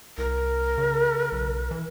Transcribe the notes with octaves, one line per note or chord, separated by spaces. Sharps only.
C2 A#4
C#3
B1
E3